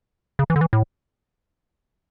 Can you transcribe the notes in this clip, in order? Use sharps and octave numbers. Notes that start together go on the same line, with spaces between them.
C#3
E3
D3
E3
A2